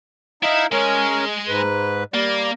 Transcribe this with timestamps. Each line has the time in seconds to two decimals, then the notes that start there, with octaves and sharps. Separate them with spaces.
0.43 D#4 E4 E5 F5
0.72 G#3 C#4 A#4
1.48 G#2 B4
2.14 G3 A#3 D5